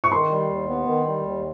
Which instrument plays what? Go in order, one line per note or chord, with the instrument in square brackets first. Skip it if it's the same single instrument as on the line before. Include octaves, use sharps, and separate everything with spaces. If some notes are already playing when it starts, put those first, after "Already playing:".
[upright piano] C#6
[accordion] D#3 [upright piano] C6
[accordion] G3
D#2
B3
D#3
G3
D#2